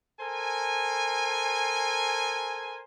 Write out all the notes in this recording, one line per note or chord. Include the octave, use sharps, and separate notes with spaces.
A4 A#4 C5 G#5